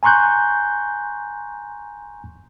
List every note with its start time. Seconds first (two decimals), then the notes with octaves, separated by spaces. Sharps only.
0.03 G#5 A#5 C6 C#6 F#6 G6